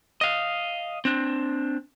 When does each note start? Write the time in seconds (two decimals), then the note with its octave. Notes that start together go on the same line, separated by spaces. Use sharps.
0.21 D#5 F5
1.05 C4 D4